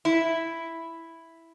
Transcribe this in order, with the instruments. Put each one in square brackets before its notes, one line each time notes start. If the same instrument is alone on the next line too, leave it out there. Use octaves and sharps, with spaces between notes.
[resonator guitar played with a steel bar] E4